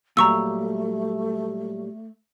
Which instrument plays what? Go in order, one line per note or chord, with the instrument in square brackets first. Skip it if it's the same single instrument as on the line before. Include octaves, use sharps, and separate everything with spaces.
[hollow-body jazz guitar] A#2 F#3 G3 [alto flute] A3 [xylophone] A#5 C#6 E6